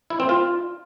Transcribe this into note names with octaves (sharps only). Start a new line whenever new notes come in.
E4
C4
F4